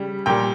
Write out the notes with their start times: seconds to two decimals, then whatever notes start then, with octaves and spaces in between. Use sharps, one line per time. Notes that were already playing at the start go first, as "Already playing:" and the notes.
Already playing: C#3 G3
0.26 A#2 G3 G5